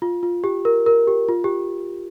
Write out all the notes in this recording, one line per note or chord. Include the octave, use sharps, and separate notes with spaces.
F4
F4
G4
A#4
A#4
G4
F4
G4